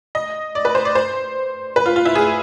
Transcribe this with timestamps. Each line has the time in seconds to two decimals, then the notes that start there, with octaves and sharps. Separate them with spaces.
0.15 D#5
0.55 D5
0.65 B4
0.75 C5
0.85 D5
0.95 C5
1.76 B4
1.86 F4
1.96 F4
2.05 E4
2.15 G#4